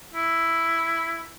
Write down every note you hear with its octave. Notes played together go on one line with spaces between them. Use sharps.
E4